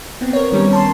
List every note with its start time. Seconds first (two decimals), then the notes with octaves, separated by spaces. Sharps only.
0.21 B3 C4
0.33 A#4 C#5
0.52 D#3 G3 C#4 C#5
0.73 A5 C6